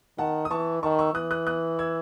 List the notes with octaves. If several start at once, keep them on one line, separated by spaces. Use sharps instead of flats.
D#3 F#5 A5
D#6
E3 A5 C#6
D#3 A5 C#6
C#6 E6
E3 D#6 F#6
D#6 F#6
D#6 F#6
E6 G#6